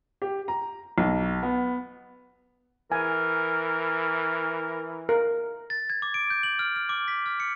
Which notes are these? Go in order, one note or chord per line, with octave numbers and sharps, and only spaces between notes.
G4
A#5
B1
B3
E3 A#4 G#5
A#4
A6
G#6
D6
D7
G6
F#7
F6
F6
D6
B6
F6
C#7